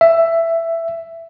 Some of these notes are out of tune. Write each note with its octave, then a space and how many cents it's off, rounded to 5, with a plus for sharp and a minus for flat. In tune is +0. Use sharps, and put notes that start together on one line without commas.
E5 +10